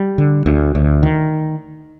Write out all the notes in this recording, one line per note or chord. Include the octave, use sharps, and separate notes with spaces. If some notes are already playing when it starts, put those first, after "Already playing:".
Already playing: G3
D3
D2
D2
D#3